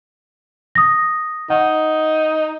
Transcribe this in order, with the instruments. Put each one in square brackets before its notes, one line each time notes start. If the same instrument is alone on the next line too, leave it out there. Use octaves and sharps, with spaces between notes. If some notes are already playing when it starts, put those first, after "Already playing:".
[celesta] D#6 A#6
[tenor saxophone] D#4 [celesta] F#5